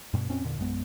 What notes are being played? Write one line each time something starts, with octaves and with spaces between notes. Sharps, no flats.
G2 B2
F2 A#2 C4 C#4
E2 A#2 D3
A#1 F#2 G#3 B3